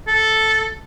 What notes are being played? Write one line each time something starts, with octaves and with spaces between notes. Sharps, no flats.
A4